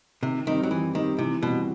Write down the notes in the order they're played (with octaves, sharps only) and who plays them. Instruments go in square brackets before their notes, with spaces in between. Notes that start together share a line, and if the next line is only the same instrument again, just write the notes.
[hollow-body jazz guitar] C3 [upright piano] D#3
[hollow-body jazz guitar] D#3 [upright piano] G3 C4 D#4 G4
[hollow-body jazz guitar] F#3
[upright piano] D#3 [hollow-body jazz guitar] E3
[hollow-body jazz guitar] D#3 [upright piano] G3 C4 D#4 G4
[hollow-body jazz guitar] C3 [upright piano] E3
[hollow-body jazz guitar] B2 [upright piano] G3 C4 F#4